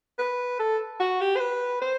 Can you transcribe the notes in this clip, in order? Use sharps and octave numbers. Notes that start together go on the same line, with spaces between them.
B4
A4
F#4
G4
C5
B4
C5